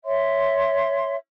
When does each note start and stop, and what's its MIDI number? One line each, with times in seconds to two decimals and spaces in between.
0.05 1.15 73
0.05 1.15 76
0.05 1.15 84